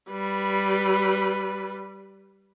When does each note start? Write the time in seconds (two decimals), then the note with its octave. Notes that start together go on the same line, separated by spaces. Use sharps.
0.10 G3 B4